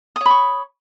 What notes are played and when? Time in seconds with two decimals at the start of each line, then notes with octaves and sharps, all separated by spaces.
0.16 D#6
0.21 C#5
0.26 B5
0.30 C#6